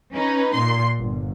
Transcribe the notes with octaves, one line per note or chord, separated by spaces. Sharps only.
C#4 D#4 B4
A#2 C6
G1